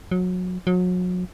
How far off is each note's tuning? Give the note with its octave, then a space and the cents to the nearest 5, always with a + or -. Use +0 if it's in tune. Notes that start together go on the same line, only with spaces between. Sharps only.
F#3 -25
F#3 -35